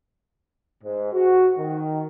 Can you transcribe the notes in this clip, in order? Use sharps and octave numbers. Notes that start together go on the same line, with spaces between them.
G#2
F#4
D#3